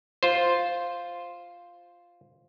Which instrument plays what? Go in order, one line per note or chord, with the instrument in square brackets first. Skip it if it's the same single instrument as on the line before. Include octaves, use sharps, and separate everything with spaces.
[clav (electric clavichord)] F4 C5